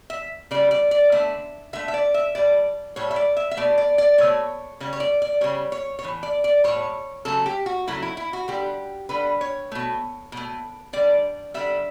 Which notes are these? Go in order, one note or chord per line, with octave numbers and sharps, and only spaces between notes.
E5
C#3 G3 D5
D5
D5
D3 A3 E5
D3 A3 E5
E5
D5
E5
A2 G3 D5
A2 G3 C#5
E5
D5
E5
E5
B2 A3 D5
D5
D5
B2 A3 C#5
C#3 G3 C#5
C#5
D5
D5
C#3 G3 C#5
C#5
C#5
A2 E3
D5
D5
A2 E3 G3 C#5
C#3 F#3 A3 A4
G4
F#4
C#3 F#3 A3 E4
E4
E4
F#4
D3 G3 G4
D3 G3 B4
C#5
B2 A3
B2 A3
D3 G3 D5
D3 G3 E5